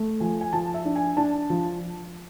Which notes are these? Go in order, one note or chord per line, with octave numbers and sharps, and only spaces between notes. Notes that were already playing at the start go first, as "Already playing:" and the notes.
Already playing: A3
F3 G#5
G#5
F3 A5
E5
D4
G#5
D4 A5
F3